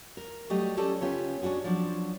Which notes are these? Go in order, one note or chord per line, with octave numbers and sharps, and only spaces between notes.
A#4
F#3 G3 A3 G4 D#5
C#4 G4 A4 D5 D#5
C#3 B3 C#4 F4 G4
C#4 D4 F4 F#4 G#4
F3 F#3 C4 D4